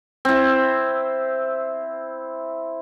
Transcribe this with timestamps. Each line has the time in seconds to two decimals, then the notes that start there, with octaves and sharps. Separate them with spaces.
0.25 C4 E4